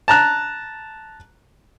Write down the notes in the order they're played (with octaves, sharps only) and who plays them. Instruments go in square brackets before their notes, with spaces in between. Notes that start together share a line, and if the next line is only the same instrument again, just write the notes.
[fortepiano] A5 A#5 F#6